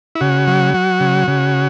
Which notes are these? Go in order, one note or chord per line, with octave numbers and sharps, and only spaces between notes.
E4
C#3 F#4
F#3
F#3
C#3
C#3